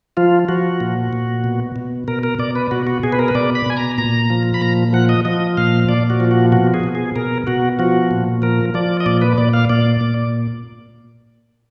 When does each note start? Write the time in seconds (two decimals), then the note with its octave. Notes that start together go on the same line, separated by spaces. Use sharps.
0.17 F3 F4
0.49 F3 F#4
0.80 A#2
1.13 A#2
1.44 B2
1.76 B2
2.08 B2 A#4
2.23 A#4
2.39 B2 D5
2.55 B4
2.71 B2 F#4
2.87 F#4
3.03 B2 G#4
3.12 B4
3.19 A#4
3.28 B4
3.35 B2 D5
3.55 B5
3.66 B2 G#5
3.77 A#5
3.98 A#2 A#5
4.30 F3
4.54 B5
4.61 A#2 A#5
4.93 F3 F#5
5.09 D#5
5.25 F3 D#5
5.57 A#2 F5
5.89 A#2 D5
6.10 F#4
6.20 F3
6.31 F#4
6.52 B2 F#4
6.74 G#4
6.83 B2
6.95 G#4
7.16 B2 A#4
7.47 B2 F#4
7.79 F3 F#4
8.11 A#2
8.42 F3 A#4
8.74 F3 D5
9.00 D#5
9.06 A#2 D5
9.22 B4
9.38 A#2 D5
9.54 F5
9.70 A#2 D5
10.01 A#2